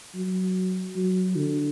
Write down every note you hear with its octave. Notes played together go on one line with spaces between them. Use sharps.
F#3
F#3
D3